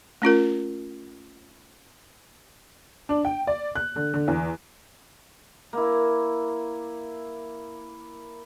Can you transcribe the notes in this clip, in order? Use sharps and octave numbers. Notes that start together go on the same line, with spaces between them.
A3 C#4 F4 A#4
D4
G5
D5
F#6
D3
D3
E2
A#3 E4